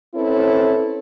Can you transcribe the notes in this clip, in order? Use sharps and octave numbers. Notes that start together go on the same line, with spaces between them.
C4 C#4 E4 A4 B4 C#5